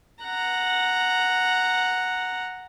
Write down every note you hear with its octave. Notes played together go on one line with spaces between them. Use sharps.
F#5 A#5